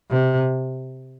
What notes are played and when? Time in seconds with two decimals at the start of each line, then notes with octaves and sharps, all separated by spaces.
0.11 C3